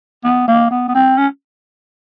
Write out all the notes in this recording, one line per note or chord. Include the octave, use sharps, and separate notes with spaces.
B3
A#3
B3
B3
C4
C#4